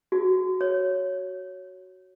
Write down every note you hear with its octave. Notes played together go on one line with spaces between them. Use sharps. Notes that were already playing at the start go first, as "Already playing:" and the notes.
F#4
C#5